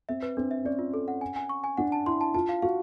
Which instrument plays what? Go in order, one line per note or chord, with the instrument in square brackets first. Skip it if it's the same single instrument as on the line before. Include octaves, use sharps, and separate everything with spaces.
[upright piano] C4 [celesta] E5
[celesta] B4
[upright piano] C4 [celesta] D4
[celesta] E5
[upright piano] C#4 [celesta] D5
[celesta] F4
A4
F#5
G#5
G#5
C#6
G#5
[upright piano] D4 [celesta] F#5
[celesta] A5
[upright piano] E4 [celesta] C6
[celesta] A5
[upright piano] F4 [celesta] A5
[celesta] F5
[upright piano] F#4 [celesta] F5